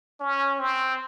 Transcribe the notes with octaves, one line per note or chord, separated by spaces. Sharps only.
C#4
C4